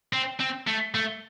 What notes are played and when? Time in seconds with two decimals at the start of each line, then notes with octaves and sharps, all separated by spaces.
0.13 C4
0.40 C4
0.67 A3
0.95 A3